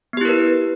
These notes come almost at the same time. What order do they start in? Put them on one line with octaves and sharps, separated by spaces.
B3 G4 E4 A#4 B4